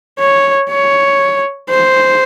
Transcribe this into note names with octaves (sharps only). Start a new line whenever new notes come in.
C#5
C#5
C5